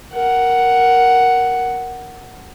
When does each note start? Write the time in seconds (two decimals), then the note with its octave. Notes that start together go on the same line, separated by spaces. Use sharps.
0.14 A#4 F#5